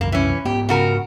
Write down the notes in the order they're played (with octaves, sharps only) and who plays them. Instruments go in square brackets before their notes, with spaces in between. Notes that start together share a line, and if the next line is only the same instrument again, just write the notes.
[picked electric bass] C2 F#2 [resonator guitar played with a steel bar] A#3
[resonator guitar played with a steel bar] E3 C#4
[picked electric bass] G#2 B3 [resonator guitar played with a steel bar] G4
[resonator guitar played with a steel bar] C#3 F#4 A#4